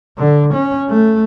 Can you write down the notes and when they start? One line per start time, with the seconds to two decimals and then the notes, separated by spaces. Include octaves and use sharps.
0.18 D3
0.54 C#4
0.90 A3